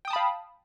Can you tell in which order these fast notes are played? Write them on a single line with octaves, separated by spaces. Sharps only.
G5 D#6 A5 B5 F5